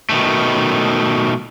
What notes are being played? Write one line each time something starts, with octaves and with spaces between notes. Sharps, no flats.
B2 D#3 A3